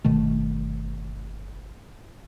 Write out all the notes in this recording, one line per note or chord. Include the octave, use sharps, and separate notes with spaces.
G1 B2 D#3 A3